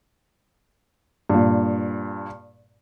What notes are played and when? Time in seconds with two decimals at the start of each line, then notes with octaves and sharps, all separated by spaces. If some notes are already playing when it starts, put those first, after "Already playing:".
1.30 G2 A#2